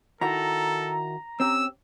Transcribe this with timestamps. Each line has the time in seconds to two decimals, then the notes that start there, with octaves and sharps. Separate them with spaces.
0.21 D#3 E4 F#4 A4 A#5
1.40 C4 C#4 G4 E6